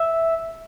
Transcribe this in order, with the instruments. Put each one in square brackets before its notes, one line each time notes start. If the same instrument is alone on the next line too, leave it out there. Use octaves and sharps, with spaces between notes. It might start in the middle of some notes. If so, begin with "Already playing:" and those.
Already playing: [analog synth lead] E5